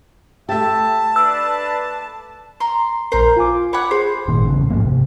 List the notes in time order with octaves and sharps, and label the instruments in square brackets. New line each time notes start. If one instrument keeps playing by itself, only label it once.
[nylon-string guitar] A3 G4 [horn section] E5 [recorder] A5
[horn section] D4 B4 [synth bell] E6
[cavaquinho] A#5 C6
[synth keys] A#1 A#4 [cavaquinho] C5 A#5
[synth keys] F4 G#5 D6
[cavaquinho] C#5 F#5 [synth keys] B5 D6
[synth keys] G#4 [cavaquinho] C5
[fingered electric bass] G#1 A#2 D#3
A1 C#3
G#2 F3 A#3
C3